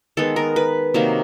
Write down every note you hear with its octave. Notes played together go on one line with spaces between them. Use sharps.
D#3 G#3 B3 A4
A#4
B4
C3 D#3 F#3 A#3